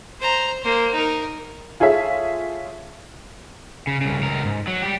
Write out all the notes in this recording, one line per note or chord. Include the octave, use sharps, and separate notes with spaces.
C5 A#5
A#3 C5
D#4 A#4
F4 G#4 A4 C#5 E5
C#3
C2 C#3
C#2 A#4
G#2
F#3
G3 G4